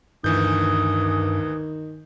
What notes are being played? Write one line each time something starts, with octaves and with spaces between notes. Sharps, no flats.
D2 G2 D#3 E3 D#6 G6